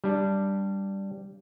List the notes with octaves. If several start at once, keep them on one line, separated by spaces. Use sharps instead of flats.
G3 D4